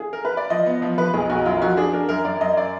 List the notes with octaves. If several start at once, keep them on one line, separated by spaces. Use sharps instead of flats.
G#4
A#4
B4
D5
F3 D#5
B3
F3
F3 B4
B1 G#4
B1 F#4
F#2 F4
F3 F#4
D4 G#4
D4 A#4
F#2 A#4
F#2 D5
F#2 D#5
D5